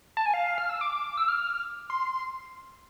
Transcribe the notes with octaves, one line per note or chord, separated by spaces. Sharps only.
A5
G#5
F5
F6
E6
D6
E6
F6
C6